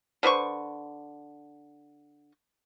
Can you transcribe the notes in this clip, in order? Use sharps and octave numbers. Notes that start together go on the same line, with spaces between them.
D3 B4 C5 C#6